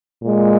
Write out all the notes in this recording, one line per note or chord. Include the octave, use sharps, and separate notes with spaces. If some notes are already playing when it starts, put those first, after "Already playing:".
A#2 G#3